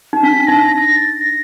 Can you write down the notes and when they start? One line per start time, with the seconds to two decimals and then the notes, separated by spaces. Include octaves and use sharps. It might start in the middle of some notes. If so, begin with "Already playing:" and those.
0.13 D#4
0.23 D4 B6
0.47 D#4 A#6
0.72 A#6
0.96 A6
1.21 A#6